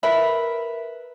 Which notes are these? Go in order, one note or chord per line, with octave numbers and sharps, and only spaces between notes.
A#4 B4 E5 B5